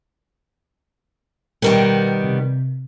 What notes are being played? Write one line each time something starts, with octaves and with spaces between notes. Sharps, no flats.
B2 D#3 G3 B3 A#4
C3